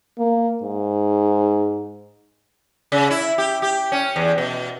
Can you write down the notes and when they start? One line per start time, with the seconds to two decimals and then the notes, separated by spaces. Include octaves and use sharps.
0.18 A#3
0.63 G#2
2.92 C#3
3.11 E4
3.38 G4
3.62 G4
3.92 C#4
4.16 E2
4.38 B2